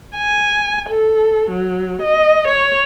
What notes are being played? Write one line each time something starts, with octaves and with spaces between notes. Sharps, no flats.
G#5
A4
F#3
D#5
C#5